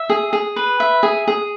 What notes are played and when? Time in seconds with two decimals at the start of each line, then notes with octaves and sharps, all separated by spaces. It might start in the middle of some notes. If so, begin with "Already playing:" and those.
Already playing: E5
0.10 G#4
0.33 G#4
0.56 B4
0.80 E5
1.03 G#4
1.28 G#4